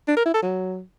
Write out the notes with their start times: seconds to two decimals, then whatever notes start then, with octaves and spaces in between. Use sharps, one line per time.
0.08 D4
0.17 A#4
0.25 E4
0.34 A4
0.43 F#3